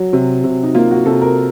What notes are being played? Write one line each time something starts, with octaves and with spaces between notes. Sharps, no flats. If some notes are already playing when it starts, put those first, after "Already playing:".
Already playing: F#3
C3
C3
D#4
A#3 F4
F#4
C3 A4
A#4